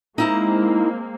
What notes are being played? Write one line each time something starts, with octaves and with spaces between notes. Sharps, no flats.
G#3 A#3 C4 D#4 E4 A#5